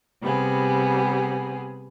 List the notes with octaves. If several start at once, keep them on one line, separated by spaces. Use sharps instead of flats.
C3 G3 B3 G#4